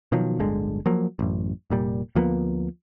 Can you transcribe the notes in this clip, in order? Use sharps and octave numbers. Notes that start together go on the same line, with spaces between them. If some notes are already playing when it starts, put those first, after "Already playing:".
B2 D#3 F3 F#3
D1 G1 D3 G#3
F3 F#3 A#3
A1 F#2
F1 A#2 G3
D2 F3 A#3 B3